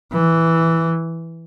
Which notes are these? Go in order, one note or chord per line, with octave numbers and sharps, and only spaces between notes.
E3